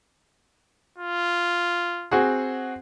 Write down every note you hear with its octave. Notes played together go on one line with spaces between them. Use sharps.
F4
C4 F#4 G#4